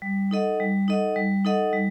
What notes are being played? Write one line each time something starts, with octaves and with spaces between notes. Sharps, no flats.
G3
D#4 A4 D#5 F#5
G3
D#4 A4 D#5 F#5
G3
D#4 A4 D#5 F#5
G3